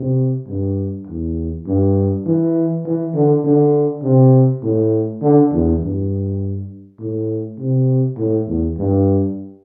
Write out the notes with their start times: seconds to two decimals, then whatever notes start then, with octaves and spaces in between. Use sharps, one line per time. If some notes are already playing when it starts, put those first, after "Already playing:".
Already playing: C3
0.48 G2
1.07 E2
1.67 G2
2.26 E3
2.85 E3
3.14 D3
3.44 D3
4.03 C3
4.63 A2
5.22 D3
5.52 E2
5.81 G2
6.99 A2
7.58 C3
8.17 A2
8.48 E2
8.77 G2